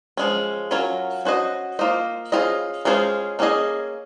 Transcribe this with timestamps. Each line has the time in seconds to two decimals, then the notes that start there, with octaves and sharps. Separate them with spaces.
0.17 F3 G#3 C#4
0.71 F#3 C#4 F4 A#4 C#5
1.25 C#4 F#4 C5 D#5
1.79 A#3 F4 C5 D#5
2.32 C#4 F4 G#4 C5 D#5
2.85 G#3 C#4 F4 G#4 C5
3.39 A#3 C#4 G#4 D#5